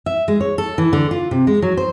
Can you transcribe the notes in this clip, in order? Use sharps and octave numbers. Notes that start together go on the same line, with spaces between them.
E5
G#3
C#5
A4
E3
D3
F4
C3
G#3
F#3
C5